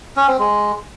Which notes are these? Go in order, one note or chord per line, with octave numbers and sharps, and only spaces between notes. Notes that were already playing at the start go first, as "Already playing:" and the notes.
C#4
C4
G#3